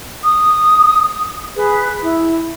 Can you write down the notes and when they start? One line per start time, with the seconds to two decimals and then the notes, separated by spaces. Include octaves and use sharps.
0.23 D#6
1.55 G#4 B4
2.00 E4